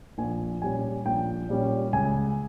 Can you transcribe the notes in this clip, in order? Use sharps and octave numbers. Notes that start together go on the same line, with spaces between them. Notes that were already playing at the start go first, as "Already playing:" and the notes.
A#1 G#5
A#2 G3 C#4 G#5
A#1 G5
A#2 G3 C#4
C#2 G#5